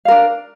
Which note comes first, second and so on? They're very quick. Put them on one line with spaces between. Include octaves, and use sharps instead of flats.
F5 A#4 D4